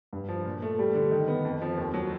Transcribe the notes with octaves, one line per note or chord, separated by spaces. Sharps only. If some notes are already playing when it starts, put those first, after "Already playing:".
G2
F3
A#2
A3
G3
D3
D#3
B3
F2
F3
D#2
F#3